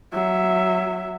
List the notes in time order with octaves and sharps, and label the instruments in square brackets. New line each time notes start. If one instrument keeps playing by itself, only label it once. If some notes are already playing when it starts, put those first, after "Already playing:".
[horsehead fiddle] F#3 E5